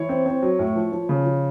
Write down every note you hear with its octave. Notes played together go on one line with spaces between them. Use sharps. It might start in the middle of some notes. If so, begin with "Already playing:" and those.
Already playing: E3 C#5
C4
C4
F#3
A2
F3
F3
C#3
F3